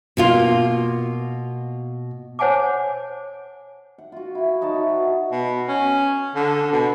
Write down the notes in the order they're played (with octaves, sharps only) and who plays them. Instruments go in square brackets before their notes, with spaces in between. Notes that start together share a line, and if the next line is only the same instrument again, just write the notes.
[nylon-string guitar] B2 A#3 F4
[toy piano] C5 C#5 F#5 G#5 A5 D6
[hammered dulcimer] F#5
F4 F#4
E4 F#4
D#4 F#4 C#5 A5
E5
B4
[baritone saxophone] B2
C#4
D3
B2